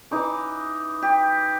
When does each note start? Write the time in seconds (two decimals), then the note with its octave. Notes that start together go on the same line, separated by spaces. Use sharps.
0.11 E3 D#4 D6
1.02 G4